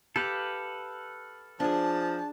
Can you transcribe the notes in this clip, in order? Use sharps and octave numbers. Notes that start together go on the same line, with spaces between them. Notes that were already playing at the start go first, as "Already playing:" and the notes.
G4 A4 B4 F5
F3 D4 G#4 A5